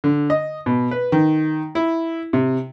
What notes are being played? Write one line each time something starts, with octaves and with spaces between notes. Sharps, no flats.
D3
D#5
B2
B4
D#3
E4
C3